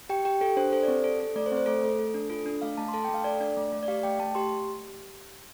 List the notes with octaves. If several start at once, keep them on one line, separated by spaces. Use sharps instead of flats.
G4 G5
G4 G5
G4 A4
D4 C5
A4 C5
D5
C4
A4
A4
A3 D5
C5
C4
C5
A3 A4
A3 A4
A4
D4
F4 A4
D4
A3 F5
A3 A5
C6
A4 A5
G5
A3
F5
A4 D5
D4 D5
A3
A3
D5
G4 F5
A3 G5
A3 A5
G4 C6